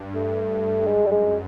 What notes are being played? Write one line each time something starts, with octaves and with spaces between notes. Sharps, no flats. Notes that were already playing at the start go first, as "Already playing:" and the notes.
Already playing: G2
A3
F#2 G#3
G3
G#3